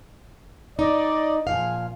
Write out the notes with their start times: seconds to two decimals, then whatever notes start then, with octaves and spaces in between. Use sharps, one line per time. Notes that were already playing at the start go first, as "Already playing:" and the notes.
0.79 D#4 D5 D#5
1.47 A#2 F3 G#4 F5